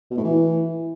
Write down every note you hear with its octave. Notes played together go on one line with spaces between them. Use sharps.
B2
A2
E3